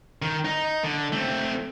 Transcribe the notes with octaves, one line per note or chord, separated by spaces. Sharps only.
D#3
D#4
D3
A3 C4